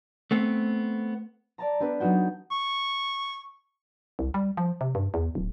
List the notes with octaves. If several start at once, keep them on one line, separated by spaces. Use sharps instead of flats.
A3 B3 C4
D5 A5 A#5
B3 D4 G4 A4 B4
F#3 B3 D#4 F#4 G5
C#6
C2
G3
F3
C3
G2
E2
D1